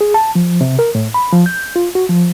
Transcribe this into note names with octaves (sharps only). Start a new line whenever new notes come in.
G#4
A5
F3
C3
A#4
A2
B5
F3
G6
F4
F#4
F3